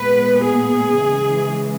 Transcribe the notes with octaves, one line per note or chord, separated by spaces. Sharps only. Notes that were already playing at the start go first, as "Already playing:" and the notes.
Already playing: A#2 G#3 B3 B4
G#4
C#3 E3 G#3